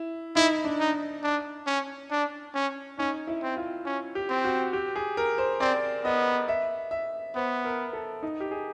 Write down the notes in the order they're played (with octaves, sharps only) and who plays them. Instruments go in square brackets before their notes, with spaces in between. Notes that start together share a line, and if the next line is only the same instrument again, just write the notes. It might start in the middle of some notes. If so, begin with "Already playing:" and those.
Already playing: [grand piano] E4
[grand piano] D#4 [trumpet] E4
[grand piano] D4
[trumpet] D#4
D4
C#4
D4
C#4
[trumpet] C#4 [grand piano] D#4
[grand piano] E4
[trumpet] C4
[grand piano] F4
[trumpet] C#4
[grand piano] G4
[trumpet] C4
[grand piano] F#4
G4
G#4
A#4
C5
[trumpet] C4 [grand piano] D5
[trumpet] B3 [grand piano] D#5
[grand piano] E5
E5
[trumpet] B3 [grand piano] C5
[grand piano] A#4
A4
D#4
G4
G#4